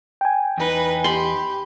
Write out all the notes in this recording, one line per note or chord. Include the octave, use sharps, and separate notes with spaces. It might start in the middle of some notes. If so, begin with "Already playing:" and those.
G5 G#5
E2 D#4 B4
G4 B5 C6